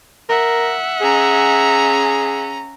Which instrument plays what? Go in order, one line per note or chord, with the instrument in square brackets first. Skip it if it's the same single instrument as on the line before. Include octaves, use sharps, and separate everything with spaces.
[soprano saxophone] A#4 [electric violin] E5 F#5
[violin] C#4 A#5 [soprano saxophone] G#4